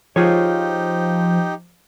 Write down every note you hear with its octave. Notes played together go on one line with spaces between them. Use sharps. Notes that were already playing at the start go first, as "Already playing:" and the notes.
F3 D#4 F4 G4 G#4 C#5